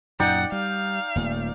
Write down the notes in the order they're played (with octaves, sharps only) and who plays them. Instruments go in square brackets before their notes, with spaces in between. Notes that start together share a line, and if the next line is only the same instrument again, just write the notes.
[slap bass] F#2 A#2 [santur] D#4 D5 G5 [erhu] F#5
[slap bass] G3 [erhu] F5
[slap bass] D#1 A#2 A3